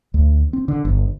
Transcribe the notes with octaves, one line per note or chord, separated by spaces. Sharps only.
D2
C4
D3
G1